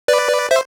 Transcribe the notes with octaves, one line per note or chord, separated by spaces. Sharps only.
B4 D5
C5 E5